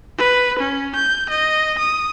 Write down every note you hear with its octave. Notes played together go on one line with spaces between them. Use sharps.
B4
C#4
G6
D#5
D#6